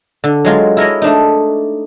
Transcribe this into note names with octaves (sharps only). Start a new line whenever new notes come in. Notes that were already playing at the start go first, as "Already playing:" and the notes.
D3
F#3 G#3 F4
E4 A#4 C#5 D#5
A3 D4 D#4